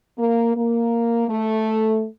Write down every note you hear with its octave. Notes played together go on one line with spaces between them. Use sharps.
A#3
A#3
A3